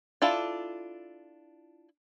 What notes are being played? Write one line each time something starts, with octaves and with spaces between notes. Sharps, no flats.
D4 E4 F4 A4